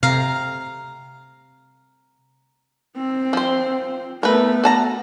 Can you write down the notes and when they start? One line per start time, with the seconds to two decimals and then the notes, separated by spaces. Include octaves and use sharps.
0.03 C3 F5 A#5
2.97 C4
3.33 F3 C5
4.23 A3 B3 A#4 B4
4.64 F#4 A5 A#5